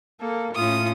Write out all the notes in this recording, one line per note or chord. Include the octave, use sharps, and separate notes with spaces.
A#3 A4
A2 C#4 F4 D#6